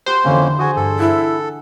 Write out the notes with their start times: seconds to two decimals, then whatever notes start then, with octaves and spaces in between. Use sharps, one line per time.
0.06 F#4 G4 A#4 C5
0.25 F2 D3 E3 A#3 C#4
0.59 F#4 G#4 G#5 D#6
0.76 G2 A4
0.99 E4 E5 F#5